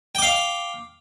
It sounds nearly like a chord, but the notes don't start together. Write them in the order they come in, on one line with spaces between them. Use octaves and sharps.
G5 D6 F5